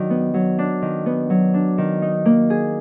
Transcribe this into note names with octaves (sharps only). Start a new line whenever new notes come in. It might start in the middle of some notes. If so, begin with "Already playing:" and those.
Already playing: D#3 F#3 D4
B3
F#3
D4
D#3
B3
F#3
D4
D#3
D#4
A#3
G#4